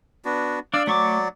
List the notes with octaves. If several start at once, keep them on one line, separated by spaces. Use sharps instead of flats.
B3 D4 F#4
D4 D5 F5 E6
F#3 A3 D5 C#6 D6